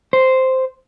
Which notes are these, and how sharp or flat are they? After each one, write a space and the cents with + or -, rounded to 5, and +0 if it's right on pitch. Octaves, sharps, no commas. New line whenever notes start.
C5 -5